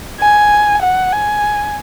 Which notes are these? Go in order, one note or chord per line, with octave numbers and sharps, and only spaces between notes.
G#5
F#5
G#5